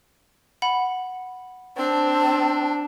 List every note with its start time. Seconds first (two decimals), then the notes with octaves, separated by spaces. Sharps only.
0.62 F#5 B5
1.77 C4 D4 A5